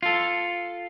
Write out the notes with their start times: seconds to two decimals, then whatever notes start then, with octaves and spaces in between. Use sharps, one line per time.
0.03 F4 A4